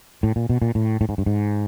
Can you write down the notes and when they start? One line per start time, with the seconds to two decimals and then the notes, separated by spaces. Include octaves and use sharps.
0.23 A2
0.36 A#2
0.49 B2
0.62 A#2
0.75 A2
1.01 A2
1.09 G#2
1.18 G2
1.26 G#2